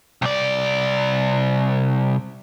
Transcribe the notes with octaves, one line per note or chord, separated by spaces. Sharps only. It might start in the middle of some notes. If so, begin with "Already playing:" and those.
C2 D5